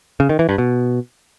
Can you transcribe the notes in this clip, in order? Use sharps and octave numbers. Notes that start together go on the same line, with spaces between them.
C#3
D#3
E3
G2
B2